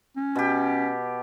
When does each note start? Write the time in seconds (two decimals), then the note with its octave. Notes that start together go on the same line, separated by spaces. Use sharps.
0.16 C#4
0.35 B2 G4